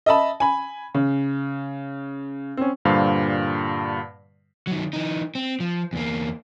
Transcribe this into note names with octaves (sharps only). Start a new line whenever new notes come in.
D#5 E5 A5 B5
G#5 B5
C#3
C4 C#4
G2 A#2 D3 G3 C5 F5
D#3 F#3
E3 D#4
C4
F3
E2 A#3